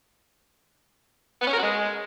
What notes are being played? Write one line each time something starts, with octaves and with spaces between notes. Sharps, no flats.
B3
C#4
A#4
F#4
G#3